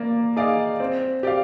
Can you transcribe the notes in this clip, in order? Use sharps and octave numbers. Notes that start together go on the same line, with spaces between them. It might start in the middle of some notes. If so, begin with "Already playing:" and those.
Already playing: A#3 D5
D#4 G#4 D5 F5
C4
G4 D5 F5